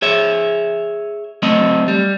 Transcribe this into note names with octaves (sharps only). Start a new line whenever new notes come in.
G#4 C#5 E5
F#3 A3 C4 D#5
G3